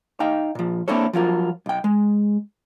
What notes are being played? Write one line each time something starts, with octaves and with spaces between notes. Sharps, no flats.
D#4 F5 G5
A#2 F3
A#3 C4 D4 E4 A4 C#5
F3 F#3 F4 A#4
B1 G5
G#3